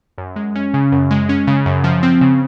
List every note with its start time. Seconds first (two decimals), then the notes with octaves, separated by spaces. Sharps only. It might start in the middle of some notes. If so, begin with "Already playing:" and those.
0.18 F#2
0.36 G#3
0.55 C#4
0.74 C#3
0.92 F#2
1.11 G#3
1.29 C#4
1.47 C#3
1.66 F#2
1.84 F3
2.03 C4
2.21 C#3